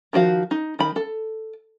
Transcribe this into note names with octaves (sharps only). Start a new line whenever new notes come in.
D#3 F3 F#4 F5
D#4
D#3 B5
A4